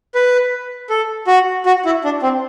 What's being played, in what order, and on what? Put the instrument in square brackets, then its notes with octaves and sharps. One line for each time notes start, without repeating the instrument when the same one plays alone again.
[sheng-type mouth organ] B4
A4
F#4
F#4
E4
D4
C4